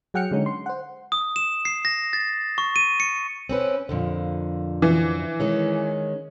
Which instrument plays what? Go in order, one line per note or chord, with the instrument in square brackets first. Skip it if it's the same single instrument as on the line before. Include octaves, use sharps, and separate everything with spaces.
[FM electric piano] F#3 G#4 F#5 G5 F6 C#7
D3 G#3 C#4 D#4
C6
C5 F#5
[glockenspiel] D#6
E7
C7
A#6
A6
C#6
D#7
C#7
[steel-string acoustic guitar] C4 C#4 B4
F2 A#2 D3
[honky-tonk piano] E3
[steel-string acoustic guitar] D#3 G#3 C#4